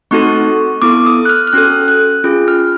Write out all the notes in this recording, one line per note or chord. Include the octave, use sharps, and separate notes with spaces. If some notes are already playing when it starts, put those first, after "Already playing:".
A3 C4 D#4 F#4 A4 C#6
B3 E4 A4 D6
D#6
F#6
F6
F6
C#4 F#4 A4 F#6
F#6
C#4 F4 G#4
F6